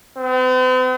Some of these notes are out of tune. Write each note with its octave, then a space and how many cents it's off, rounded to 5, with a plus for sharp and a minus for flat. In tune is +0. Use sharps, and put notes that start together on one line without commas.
C4 -45